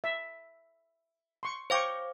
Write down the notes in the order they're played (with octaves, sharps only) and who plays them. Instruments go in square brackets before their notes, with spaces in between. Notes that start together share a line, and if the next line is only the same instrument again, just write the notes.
[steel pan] E5
C6 C#6
[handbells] C5 F5 D6 [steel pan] C#5 G5 C#6